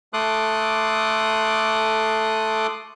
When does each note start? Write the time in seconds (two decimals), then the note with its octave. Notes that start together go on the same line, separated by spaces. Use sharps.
0.13 A3 A4 C6 D6 D#6 F#6